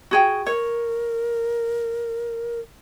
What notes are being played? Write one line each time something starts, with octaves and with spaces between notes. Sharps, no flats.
F#4 G#4 G5
A#4 C#5